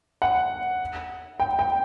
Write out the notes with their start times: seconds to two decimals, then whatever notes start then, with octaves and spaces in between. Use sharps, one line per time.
0.22 F#5
1.40 G5
1.59 G5